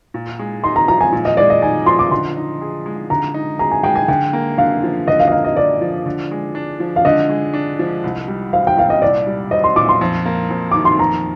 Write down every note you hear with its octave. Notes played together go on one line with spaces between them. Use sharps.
A#2
G#3
D#4 C6
A#5
F3 A#5
G#5
A#2
D#5
G#3 D5
D#5
D#4 G#5
F3 C6
D6
D3 C6
D#4
G#4
G#3
D3 A#5
D#4
G#4 A#5
G#5
G#3 G5
G#5
D3 G5
A#3
D3 F5
F3
D3 D#5
F5
D#5
A#3 F5
D#5
D3 D5
F3
D3
G#3
D4
F3
F5
D3 D#5
G#3
D4
F3
C2
G3
C4 F5
G5
A#2 F5
D#5
C2 D5
G3
C4 D#5
C6
A#2 D6
C6
F2
A#3
F2
D#3 D6
C6
F2 A#5